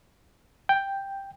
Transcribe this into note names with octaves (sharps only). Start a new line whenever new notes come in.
G5